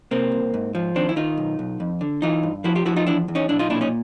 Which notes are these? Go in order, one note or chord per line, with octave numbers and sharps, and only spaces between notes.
C3 A#3 C4
C2
G#2
F3
D#3 C4 D4
E4
D#3 D#4 F4
B1
B1
F2
D3
E3 D#4 F4
G2
F3 E4 F#4
F4 G4
F3 E4 F#4
D#4 F4
E2 D4 E4
E2
C#4 D#4
B1 D4 E4
D#4 F4
A#2 D4 E4
C#4 D#4